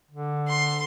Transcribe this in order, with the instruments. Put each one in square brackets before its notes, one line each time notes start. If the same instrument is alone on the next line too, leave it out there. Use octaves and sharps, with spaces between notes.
[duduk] D3
[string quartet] C6